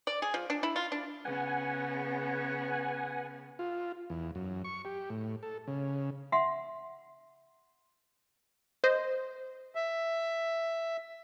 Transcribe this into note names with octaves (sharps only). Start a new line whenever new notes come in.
D5
G#4
F3
D4
E4
F4
D4
C#3 B3 B4 F#5 G#5
F4
E2
F#2
C#6
G4
A2
A4
C#3
E5 F#5 C6
C5 D#5
E5